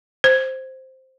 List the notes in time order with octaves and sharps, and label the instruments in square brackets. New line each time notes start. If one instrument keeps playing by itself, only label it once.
[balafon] C5